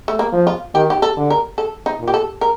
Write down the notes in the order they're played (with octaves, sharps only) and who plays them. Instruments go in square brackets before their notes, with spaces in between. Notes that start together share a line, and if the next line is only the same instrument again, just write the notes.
[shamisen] A3
A#3
[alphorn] F3
[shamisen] F4
[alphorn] D#3 [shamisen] G4
[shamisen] G4
A4
[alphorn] D3
[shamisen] A#4
A4
D#4
[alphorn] A#2
[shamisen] G4
A4
A#4